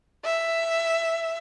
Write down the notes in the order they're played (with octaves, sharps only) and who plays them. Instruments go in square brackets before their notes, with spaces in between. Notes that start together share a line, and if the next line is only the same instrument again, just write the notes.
[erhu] E5